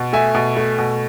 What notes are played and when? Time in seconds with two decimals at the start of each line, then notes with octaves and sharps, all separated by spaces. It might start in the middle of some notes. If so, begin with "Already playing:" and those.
Already playing: B2
0.13 A3 E5 G#5
0.35 B2
0.56 A3
0.78 B2